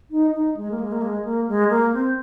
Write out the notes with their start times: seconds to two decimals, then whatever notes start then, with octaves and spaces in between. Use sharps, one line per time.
0.11 D#4
0.34 D#4
0.57 G#3
0.71 A#3
0.79 G#3
0.92 A#3
1.02 G#3
1.25 A#3
1.48 G#3
1.70 A#3
1.93 C4